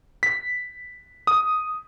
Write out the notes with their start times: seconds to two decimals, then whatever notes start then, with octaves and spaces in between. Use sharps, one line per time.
0.23 B6
1.27 D#6